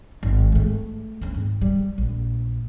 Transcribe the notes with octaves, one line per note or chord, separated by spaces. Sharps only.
G#1
G#3 A3
C#2 C4
G#2
G3
A#1